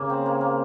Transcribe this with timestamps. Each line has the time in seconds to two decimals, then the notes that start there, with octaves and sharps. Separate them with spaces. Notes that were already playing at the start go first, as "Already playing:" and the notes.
Already playing: C#3 A#3
0.10 C4
0.26 A#3
0.41 A#3